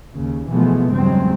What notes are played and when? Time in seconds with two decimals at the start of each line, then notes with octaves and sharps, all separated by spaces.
0.14 D#2 C#3
0.51 B2 E3 F3 G#3 A3 B3
0.91 E2 G2 C#3 F#3 G#3 C4